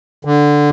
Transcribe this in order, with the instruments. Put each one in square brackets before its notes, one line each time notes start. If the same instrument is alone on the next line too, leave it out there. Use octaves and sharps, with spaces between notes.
[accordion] D3